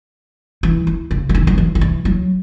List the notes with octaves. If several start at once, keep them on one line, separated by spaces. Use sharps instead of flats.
E3
E3
C#3
E3
D#3
F#3
E3
D#3
E3
F#3